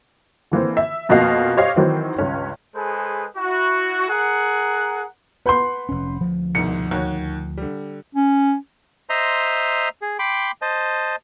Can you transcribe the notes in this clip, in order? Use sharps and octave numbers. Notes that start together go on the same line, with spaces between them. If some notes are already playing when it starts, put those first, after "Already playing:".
D3 E3 A#3 C4
E5
F2 B2 A#3 F#4 D#5 F5
G4 C5 C#5 D#5 F5
D#3 E3 F#3 C4 D#4
C#2 G2 C#4
G#3 G#4 A4 B4 C5
E4 F#4
G#4 A#4 F#5
B4 F#5 B5 C6 G6
F1 C#4
D2 F3
C2 G#2 B2 C#7
D#2 F#4 C#5
D3 G3
C#4
C5 D#5 E5 A#5 C6
G#4
G5 B5 C6 D6
C5 D#5 A5